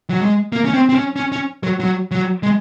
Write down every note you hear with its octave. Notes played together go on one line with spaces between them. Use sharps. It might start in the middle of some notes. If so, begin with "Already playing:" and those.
F#3
G#3
A#3
C#4
C4
C4
C#4
C#4
C#4
F#3
F#3
F#3
G#3